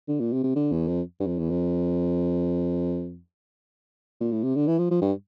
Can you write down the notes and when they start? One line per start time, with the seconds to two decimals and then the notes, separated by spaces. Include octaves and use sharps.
0.08 D3
0.20 A#2
0.33 C3
0.43 C3
0.55 D3
0.72 E2
0.87 F2
1.20 G2
1.26 F2
1.39 E2
1.50 F2
4.20 A#2
4.32 A2
4.43 C3
4.55 D3
4.67 E3
4.78 F3
4.91 F3
5.02 G2